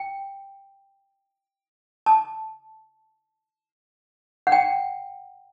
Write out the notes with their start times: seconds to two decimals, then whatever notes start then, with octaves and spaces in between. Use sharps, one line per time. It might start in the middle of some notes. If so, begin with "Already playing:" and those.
Already playing: G5
2.06 A5
4.47 F#5
4.52 G5